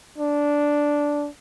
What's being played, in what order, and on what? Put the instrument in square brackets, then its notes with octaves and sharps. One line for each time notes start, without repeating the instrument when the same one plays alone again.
[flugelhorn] D4